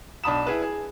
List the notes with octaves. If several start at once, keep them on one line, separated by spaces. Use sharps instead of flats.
B1 D4 A5 B5 D#6 E7
E4 G#4 B4
G#4